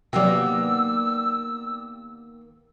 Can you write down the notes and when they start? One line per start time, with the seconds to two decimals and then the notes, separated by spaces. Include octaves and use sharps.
0.13 C3 D#3 F#3 A#3 B3 G4 D5 E6